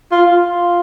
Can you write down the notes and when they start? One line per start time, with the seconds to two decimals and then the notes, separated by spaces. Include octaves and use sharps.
0.12 F4
0.26 F4